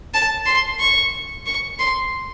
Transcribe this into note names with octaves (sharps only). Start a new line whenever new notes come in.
A5
C6
C#6
C#6
C6